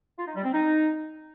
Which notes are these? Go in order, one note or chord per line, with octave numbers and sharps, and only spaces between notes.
F4
D#4
G3
C4
D#4